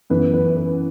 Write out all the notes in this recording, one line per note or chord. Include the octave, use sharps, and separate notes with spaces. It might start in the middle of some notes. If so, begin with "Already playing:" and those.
F#2 E3 B3 B4
B4
B4